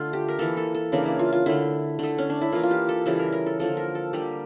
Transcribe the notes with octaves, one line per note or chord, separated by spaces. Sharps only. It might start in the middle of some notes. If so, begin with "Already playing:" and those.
Already playing: D3 A3 F4
G4
A#4
E3 A#3 A4
A4
A4
C#3 E3 A#3 D4
E4
F4
F4
D3 A3 E4
D3 A3
C#4
D4
E4
E3 A#3 F4
F4
G4
A4
C#3 E3 G3 A4
A#4
A#4
A4
D3 F3 A#3 A4
A#4
A4
D3 G3 A#3 G4